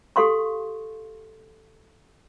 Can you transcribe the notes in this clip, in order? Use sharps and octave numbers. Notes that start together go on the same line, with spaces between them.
G4 A4 F5 C6 C#6